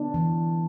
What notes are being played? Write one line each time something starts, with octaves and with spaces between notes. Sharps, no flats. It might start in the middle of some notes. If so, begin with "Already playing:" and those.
Already playing: B3 D4
E3